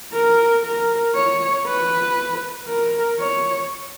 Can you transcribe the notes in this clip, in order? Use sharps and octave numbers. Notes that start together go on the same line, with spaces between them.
A#4
A#4
C#5
B4
A#4
C#5